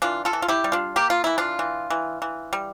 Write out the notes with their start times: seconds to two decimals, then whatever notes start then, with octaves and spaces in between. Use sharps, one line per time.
0.02 E3 D4 F4
0.25 F4 A4
0.33 E3
0.42 F4
0.48 E4 G4
0.64 G3
0.72 D4 F4
0.96 A#3 G4
1.10 F4
1.24 E3 E4
1.38 D4 F4
1.59 E3
1.90 E3
2.22 E3
2.53 G3